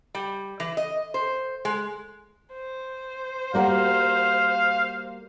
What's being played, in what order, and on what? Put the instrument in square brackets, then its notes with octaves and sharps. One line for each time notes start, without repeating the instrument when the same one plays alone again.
[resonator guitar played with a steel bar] G3
E3
D#5
C5
G#3
[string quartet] C5
[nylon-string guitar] G3 A#3 F#4 [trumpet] F5